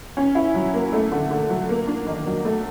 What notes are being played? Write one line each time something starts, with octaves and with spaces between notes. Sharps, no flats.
C#4
E4
F#3
A#3
A3
D3
D3
F#3
A#3
D4
D#3
F#3
A3